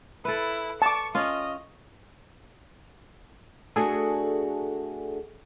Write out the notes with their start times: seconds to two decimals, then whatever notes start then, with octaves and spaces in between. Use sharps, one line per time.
0.25 E4 A4 B4
0.82 A5 C#6 D6
1.15 C#4 F4 D#5
3.76 A3 D4 F#4 G#4 A4